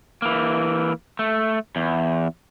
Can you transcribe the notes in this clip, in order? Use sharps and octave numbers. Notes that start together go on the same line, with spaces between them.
E3 A#3
A3
E2